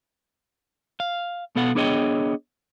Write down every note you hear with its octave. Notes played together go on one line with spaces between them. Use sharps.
F5
B2 B3 A4 F5 F#5
B3 D4 G#4 C#5 D#5 G5